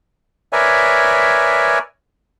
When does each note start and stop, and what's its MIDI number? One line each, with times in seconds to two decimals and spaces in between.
0.53 1.79 70
0.53 1.79 71
0.53 1.79 73
0.53 1.79 74
0.53 1.79 76
0.53 1.79 80